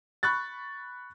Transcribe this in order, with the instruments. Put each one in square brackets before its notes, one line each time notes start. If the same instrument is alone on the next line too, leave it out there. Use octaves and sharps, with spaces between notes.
[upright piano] B5 C#6 F#6 A6